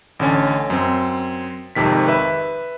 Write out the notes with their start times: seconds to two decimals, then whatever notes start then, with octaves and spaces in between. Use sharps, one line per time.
0.19 A1 D3 C#4
0.70 F#2 C4
1.75 G#1 F2 C3 D#3 B6
2.08 B4 E5